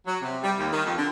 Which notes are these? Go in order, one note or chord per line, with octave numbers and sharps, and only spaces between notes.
F#3
C3
G3
D#2
D#3
F2
D3